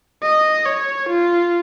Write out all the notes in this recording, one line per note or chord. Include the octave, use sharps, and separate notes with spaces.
D#5
C#5
F4